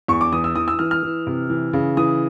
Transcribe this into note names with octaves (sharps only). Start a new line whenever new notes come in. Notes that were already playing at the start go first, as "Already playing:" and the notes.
E2 C#6
D6
E3 D#6
E6
E3 D#6
E6
E3 F6
F6
E3
C3
E3
C#3
E3 D#6